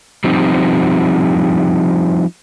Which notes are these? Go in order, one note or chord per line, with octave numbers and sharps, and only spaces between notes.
F3 G3 C4 D#4